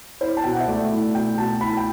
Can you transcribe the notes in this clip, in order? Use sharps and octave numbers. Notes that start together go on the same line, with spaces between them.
E4 C5
A5
B2 G5
F#5
E5
A3 D5
E4
B2 G5
B2 A5
E4 B5
G5